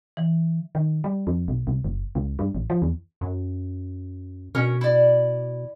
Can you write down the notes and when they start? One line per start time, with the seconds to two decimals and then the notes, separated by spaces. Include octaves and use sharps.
0.17 E3
0.75 D#3
1.04 G3
1.27 F2
1.48 B1
1.67 C2
1.84 F#1
2.15 C#2
2.39 G2
2.55 A1
2.70 F3
2.82 E2
3.21 F#2
4.55 B2 C#4 A#4
4.81 E4 D5